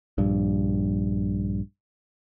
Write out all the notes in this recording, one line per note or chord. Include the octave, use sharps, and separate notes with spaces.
A#1 G2